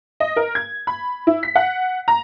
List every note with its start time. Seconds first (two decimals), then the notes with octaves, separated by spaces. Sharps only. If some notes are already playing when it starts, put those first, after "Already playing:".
0.20 D#5
0.36 A#4
0.55 G#6
0.87 B5
1.27 E4
1.43 B6
1.55 F#5
2.08 A#5